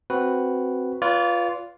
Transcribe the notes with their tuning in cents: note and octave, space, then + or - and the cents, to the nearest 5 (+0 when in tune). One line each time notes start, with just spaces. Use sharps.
C4 +0 F#4 +0 B4 +0
F4 +0 B4 +0 D5 -40